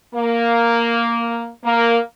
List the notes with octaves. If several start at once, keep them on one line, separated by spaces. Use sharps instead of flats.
A#3
A#3